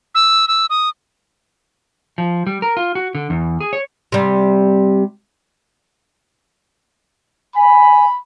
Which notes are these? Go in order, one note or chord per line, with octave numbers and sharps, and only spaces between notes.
E6
E6
D#6
F3
G3
A#4
F4
F#4
D3
E2
G#4
C#5
C3 G3
G#5 B5